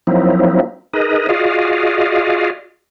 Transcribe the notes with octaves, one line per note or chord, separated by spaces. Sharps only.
F3 F#3 A#3 C4 D#4 E4
D#4 G#4 A#4 B4 D#5
F4 F#4 G#4 D5 D#5 F5